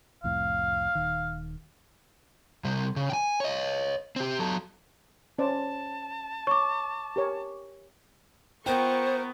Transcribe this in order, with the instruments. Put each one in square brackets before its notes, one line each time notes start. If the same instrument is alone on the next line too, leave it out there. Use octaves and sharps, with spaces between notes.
[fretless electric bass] C2 F2 A2 [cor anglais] F5
[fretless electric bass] D#1 D#3
[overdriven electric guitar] C3 G3
C#3
G5 G#5
C#5 D#5
C4 G4
F#3 A4
[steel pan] C#4 C5 D5 [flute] A5
[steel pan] C#5 [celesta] C#6 D6
[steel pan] G4 A#4 C#5
[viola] B3 [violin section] F4 A#4 C#6 [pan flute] C5 [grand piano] G5